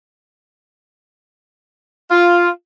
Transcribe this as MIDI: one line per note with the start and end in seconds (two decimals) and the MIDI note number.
2.11 2.48 65